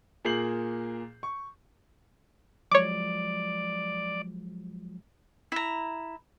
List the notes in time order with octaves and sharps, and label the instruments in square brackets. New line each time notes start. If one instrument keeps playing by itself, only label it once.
[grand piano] A#2 A#3 G#4 G6 C7 F#7
C#6
[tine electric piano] F3 F#3 G#3 [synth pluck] C#5 D6 [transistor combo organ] D5
[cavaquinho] E4 A#5